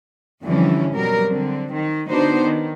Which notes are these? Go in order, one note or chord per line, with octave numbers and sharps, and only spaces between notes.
F2 D3 E3 G3 C#4 E4
B2 F#3 G3 A#4
D3 C4
D#3
D3 B3 D4 D#4 F#4 C5
D#3